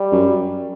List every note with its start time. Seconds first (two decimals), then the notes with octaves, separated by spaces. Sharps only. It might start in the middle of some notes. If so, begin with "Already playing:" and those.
Already playing: G3
0.12 F#2